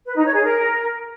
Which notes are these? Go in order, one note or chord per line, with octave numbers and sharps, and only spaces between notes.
B4
D#4
C#5
G#4
A#4